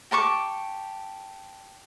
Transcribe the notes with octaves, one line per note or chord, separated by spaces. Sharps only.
G4 A5 C#6 D6